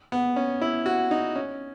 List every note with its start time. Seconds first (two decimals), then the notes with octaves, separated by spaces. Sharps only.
0.12 B3
0.36 C#4
0.62 E4
0.86 F#4
1.11 D#4
1.36 C#4